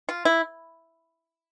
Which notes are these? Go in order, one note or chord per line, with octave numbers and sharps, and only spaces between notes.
F4
E4